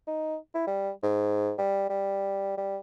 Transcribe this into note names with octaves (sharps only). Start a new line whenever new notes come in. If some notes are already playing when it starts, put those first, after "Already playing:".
D#4
E4
G3
G#2
G3
G3
G3